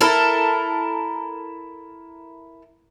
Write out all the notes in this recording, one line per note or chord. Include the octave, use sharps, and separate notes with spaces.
E4 A4 A#4